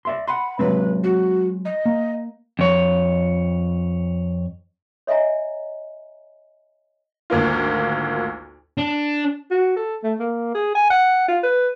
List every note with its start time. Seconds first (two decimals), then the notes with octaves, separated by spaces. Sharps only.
0.05 D5 E5 C6
0.28 F#5 B5 C6
0.59 F#3 G#3 C4 B4
1.04 F#4
1.65 D#5
1.85 A#3
2.59 F2 C#5
5.07 C#5 D#5 E5 G#5 A#5
7.30 G#1 D2 A#3 F4
8.78 D4
9.51 F#4
9.76 A4
10.04 A3
10.20 A#3
10.55 G#4
10.75 G#5
10.90 F#5
11.28 F4
11.43 B4